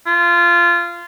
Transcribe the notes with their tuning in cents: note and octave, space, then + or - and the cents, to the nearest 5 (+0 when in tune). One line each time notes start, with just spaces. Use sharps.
F4 -20